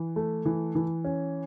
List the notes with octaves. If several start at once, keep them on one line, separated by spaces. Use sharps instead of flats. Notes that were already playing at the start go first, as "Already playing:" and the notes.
Already playing: E3
A3
E3
E3
C#4